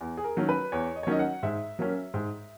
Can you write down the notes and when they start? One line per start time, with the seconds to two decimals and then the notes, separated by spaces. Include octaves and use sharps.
0.01 E2
0.18 G#4
0.24 A#4
0.37 D#3 F#3 A#3 C#4
0.49 B4
0.72 E2 C#5
0.96 D#5
1.03 C#5
1.07 D#3 F#3 A#3 C#4 D#5
1.19 F#5
1.43 G#2 E5
1.79 F#3 A#3 C#4
2.14 G#2